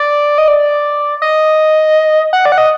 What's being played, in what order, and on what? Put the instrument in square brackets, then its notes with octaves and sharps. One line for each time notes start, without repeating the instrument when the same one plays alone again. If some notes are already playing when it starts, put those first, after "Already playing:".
Already playing: [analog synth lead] D5
D#5
D5
D#5
F#5
D5
F#5
D#5